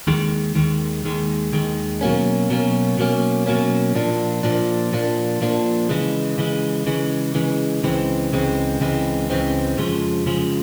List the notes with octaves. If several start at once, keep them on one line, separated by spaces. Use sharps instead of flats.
D#2 D#3 G#3
D#2 D#3 G#3
D#2 D#3 G#3
D#2 D#3 G#3
B2 F#3 A#3 C#4
B2 F#3 A#3 C#4
B2 F#3 A#3 C#4
B2 F#3 A#3 C#4
A#2 F3 A#3 D4
A#2 F3 A#3 D4
A#2 F3 A#3 D4
A#2 F3 A#3 D4
C#3 E3 G#3
C#3 E3 G#3
C#3 E3 G#3
C#3 E3 G#3
C#2 C#3 E3 G#3 C4
C#2 C#3 E3 G#3 C4
C#2 C#3 E3 G#3 C4
C#2 C#3 E3 G#3 C4
F2 C#3 F3 G#3
F2 C#3 F3 G#3